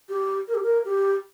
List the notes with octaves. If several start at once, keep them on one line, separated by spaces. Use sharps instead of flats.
G4
A#4
G4
A#4
G4